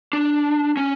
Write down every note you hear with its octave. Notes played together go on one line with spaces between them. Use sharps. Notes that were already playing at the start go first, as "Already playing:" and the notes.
D4
C#4